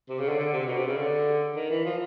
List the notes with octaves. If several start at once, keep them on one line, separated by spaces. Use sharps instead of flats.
C3
C#3
D3
D3
C3
B2
C3
C#3
D3
D#3
E3
F3